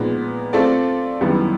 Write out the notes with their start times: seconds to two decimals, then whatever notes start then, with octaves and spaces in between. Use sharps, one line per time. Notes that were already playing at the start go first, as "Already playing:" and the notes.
Already playing: A#2 F3 G#3 B3 D#4
0.53 A3 C4 F4 A4 D5
1.21 F#2 D#3 G3 B3 E4